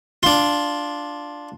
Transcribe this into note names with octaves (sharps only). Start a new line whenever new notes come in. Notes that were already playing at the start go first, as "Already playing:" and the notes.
D4 F4